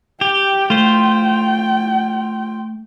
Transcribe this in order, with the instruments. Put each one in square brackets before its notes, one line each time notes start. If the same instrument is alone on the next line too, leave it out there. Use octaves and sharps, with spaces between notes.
[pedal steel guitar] G4 [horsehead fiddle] G5
[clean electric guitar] A3 [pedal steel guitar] F4 C5